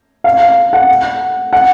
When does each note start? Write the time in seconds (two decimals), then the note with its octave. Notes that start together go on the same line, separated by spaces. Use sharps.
0.24 F5
0.40 F5
0.73 F#5
1.53 F#5